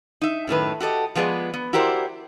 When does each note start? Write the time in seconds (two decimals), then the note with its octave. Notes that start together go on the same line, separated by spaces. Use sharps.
0.21 D#4 E5
0.47 F#2 A2 D#3 B4
0.80 F#4 G4 A4 D#5
1.15 F3 G#3 B3 G#4 D5
1.54 B3
1.73 E4 F#4 G4 A#4 C5 D5